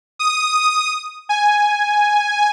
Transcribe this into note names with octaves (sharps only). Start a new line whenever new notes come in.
D#6
G#5